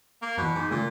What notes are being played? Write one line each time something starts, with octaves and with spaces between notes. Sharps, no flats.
A#3
F#2 B2 E3
G#2 D6
A#2 C#3 G#3 A3